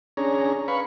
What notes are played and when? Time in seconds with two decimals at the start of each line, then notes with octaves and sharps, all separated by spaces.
0.17 C#4 D4 G#4 C#5 A#5
0.68 B4 F5 B5 C#6